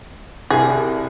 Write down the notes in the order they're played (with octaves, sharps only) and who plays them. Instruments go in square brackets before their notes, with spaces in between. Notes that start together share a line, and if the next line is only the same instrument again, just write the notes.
[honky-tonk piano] C2 [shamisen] G#4